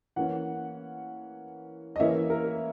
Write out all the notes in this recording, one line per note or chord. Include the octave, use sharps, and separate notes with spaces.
E3 A#3 C#4 F#5
D#5
E3 A#3 C#4 E5
A#4